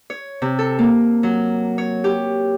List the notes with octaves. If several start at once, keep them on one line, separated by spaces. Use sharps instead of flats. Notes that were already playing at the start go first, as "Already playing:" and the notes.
C#5
C3
A4
A#3
F#3
C#5
G4